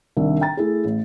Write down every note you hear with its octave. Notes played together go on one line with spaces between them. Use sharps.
C2 D#3 D4 E5
G5 A#5 A6
A3 E4 G#4
A1